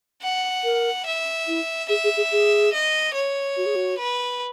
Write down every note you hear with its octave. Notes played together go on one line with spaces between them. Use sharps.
F#5
A#4
E5
E4
G#4 E5
G#4
G#4
G#4
D#5
C#5
F#4
G#4
F#4
B4